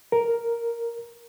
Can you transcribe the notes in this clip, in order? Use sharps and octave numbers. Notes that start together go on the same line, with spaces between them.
A#4